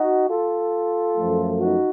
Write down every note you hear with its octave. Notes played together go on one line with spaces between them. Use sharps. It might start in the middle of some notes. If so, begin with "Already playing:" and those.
Already playing: D#4 F#4
F4 A4
F#2 F3 A3
D#4 F#4